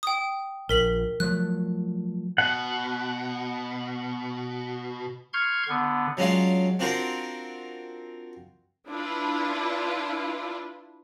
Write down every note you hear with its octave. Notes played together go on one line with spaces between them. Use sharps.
G5 D#6
A#1 A#4 B6 F#7
F3 F#3 A3 F#6
B2 F#5
C6 C#6 F6 G6 G#6
D3 B3
F#3 G#3 C#4 D4 F4 F5
C4 D4 F4 F#4 A#4 C5
D4 E4 F4 B4